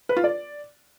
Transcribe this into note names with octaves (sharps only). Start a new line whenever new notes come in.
B4
F4
D5